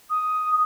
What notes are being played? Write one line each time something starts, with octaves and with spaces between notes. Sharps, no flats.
D#6